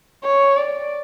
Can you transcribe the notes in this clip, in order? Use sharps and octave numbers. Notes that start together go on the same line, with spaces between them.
C#5
D5